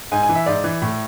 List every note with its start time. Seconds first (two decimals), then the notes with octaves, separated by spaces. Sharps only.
0.12 G#2 G#5
0.23 G#5
0.29 E3
0.35 E5
0.46 G#2 D5
0.64 E3
0.82 A2